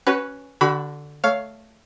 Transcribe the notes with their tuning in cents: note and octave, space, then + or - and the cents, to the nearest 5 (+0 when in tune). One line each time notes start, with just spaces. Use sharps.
C#4 +0 F#4 +30 B4 +0
D3 +0 F#4 +40 B5 +0
A3 +0 C#5 +20 F5 +0